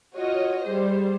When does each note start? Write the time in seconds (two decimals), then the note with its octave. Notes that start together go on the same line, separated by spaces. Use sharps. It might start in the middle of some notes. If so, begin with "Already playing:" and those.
0.17 F4 F#4 C#5 D#5
0.65 G3 G#4 C5